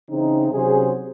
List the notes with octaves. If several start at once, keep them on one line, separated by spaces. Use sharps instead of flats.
C#3 E3 C4 D#4
C3 F#3 C#4 G#4 C5